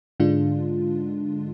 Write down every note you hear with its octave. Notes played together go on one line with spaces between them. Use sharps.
G#2 D3 G#3 D4 F4